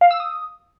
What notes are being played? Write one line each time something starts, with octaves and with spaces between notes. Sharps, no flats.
F5
E6
D#6